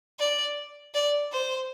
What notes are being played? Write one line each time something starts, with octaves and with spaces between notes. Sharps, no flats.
D5
D5
C5